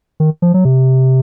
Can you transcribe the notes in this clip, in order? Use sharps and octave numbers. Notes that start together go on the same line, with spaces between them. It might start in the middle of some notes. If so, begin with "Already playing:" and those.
D#3
F3
F#3
C3